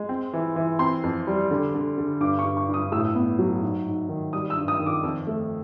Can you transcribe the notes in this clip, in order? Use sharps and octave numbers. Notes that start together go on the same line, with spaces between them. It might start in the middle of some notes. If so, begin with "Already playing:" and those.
Already playing: G#3
C4
E3
E3
C4 C6
F2
G3
D3
D3
D3
G2 D6
C#6
G2
C#6
G2
D#6
A2 E6
D#6
E6
B3
F#3
G#2
G#2
D#3
G3 D#6
E6
G2
D#6
D#3
D6
F2 E6
A3